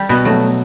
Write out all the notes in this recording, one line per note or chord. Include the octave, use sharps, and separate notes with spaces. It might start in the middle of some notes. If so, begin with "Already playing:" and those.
Already playing: G3
B2 B3
F#3 A3